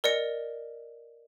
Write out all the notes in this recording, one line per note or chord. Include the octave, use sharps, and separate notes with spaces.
A#4 D5 D#5 C#7